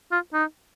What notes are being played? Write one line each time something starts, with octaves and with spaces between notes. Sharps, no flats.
F4
D#4